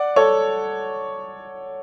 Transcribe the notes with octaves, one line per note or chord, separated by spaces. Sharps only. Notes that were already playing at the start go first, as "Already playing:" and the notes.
Already playing: D5 F#5
A4 C#5